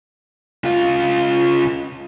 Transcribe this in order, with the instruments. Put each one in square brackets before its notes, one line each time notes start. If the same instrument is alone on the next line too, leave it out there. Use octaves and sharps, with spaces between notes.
[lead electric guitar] C#3 F4